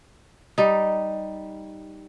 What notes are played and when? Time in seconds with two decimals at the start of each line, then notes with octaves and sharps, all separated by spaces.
0.58 G3 D#4